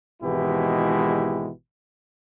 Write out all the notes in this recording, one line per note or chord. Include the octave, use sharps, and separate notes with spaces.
G#1 B2 E3 G#3 E4 G4